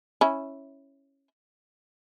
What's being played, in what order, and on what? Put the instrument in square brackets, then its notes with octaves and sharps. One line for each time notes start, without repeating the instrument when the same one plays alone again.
[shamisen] C#4 E4